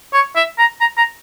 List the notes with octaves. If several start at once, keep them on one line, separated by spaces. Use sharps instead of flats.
C#5
E5
A#5
A#5
A#5